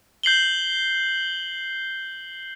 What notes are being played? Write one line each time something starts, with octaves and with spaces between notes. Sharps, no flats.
G6 C7 F#7 G7